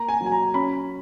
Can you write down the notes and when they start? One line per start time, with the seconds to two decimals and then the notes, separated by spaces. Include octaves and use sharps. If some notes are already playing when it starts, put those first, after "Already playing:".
Already playing: A#3 A#5
0.09 G#5
0.21 F#3
0.26 G#5
0.32 A#5
0.54 C#4 B5